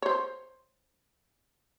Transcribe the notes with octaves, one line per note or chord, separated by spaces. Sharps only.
C5 C#5